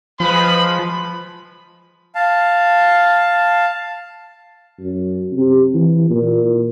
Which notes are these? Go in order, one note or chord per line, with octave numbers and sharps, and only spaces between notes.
F3 G#3 B4 B5
F5 A5
F#2
C3
E3
A#2